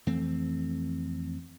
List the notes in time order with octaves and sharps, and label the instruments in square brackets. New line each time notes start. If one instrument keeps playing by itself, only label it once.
[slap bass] F2 E3 A3 C4